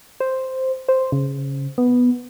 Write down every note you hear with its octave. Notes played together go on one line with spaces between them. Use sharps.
C5
C5
C#3
B3